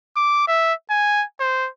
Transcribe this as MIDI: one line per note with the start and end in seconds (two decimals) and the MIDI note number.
0.17 0.47 86
0.48 0.73 76
0.90 1.24 80
1.40 1.69 72